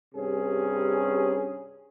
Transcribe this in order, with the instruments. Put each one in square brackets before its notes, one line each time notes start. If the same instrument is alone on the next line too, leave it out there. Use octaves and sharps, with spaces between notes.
[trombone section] G2 C3 C#4 G#4